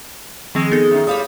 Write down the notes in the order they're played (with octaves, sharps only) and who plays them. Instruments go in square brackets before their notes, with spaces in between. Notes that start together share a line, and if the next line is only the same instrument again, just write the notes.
[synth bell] D#3 F3 C4 [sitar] G#3
[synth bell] B3 D#4 A4
[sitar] F#2 D#3
[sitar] A2 G3 [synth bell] C#5 F5 D#6